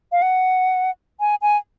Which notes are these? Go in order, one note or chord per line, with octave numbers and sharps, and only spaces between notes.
F5
F#5
G#5
G#5